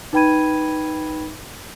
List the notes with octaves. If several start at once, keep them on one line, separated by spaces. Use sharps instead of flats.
D#4 B4 G5 B5 G#6 D#7